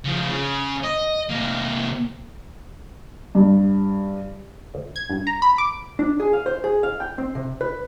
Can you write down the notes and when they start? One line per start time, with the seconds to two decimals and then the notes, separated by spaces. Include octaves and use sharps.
0.04 C#3 F3
0.29 C#3
0.84 D#5
1.30 C3 A#3
3.35 G2
4.74 D2
4.96 G#6
5.10 G2
5.27 A#5
5.42 B5
5.58 D6
5.99 D4
6.20 G#4
6.33 F5
6.46 C5
6.64 G#4
6.83 F5
7.00 G5
7.18 C4
7.35 C3
7.61 B4